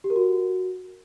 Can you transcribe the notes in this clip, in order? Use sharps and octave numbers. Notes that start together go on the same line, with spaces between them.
G4
A#4
F#4